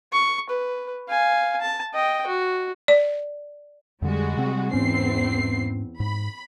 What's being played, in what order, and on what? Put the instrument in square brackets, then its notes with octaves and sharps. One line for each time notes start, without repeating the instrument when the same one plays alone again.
[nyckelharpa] C#6
B4
F5 G#5
A5
D#5 G5
F#4
[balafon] D5
[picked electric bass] F2 D3 [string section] G3 G#3 F#4
[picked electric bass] C3 C4
[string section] E2 C4 C7 [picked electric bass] G#2 C#4
[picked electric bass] G#2 [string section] B5